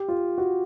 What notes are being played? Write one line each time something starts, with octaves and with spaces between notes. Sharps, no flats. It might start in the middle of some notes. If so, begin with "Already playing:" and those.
Already playing: G4
F4
F#4